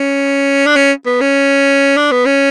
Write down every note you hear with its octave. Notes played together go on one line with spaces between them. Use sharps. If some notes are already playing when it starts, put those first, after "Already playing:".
Already playing: C#4
D4
C#4
B3
C#4
D4
B3
C#4